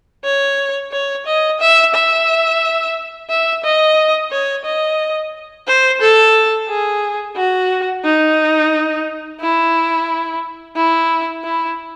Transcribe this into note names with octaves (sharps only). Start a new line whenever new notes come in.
C#5
C#5
D#5
E5
E5
E5
D#5
C#5
D#5
C5
A4
G#4
F#4
D#4
E4
E4
E4